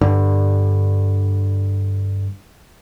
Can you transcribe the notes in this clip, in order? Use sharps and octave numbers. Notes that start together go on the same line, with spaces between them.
G2 D3